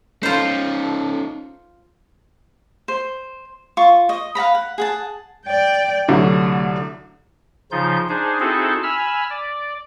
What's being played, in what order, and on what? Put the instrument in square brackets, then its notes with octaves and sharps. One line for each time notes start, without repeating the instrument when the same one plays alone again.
[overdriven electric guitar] C#4 D#4 [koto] F4 C5 [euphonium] A4
[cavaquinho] C5
F4 C#6
D#5
F5 F#5 A#5 B5
F#5
G#4 F#5 A5
[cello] D5 G5
[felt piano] C2 D3 F#3 [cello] A3
[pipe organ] C#3 F3 D#4 F4 G6
D4 D#4 G#4 C5
C4 D#4 E4 F#4 G#4 A4
G#5 B5 E6 F6
D5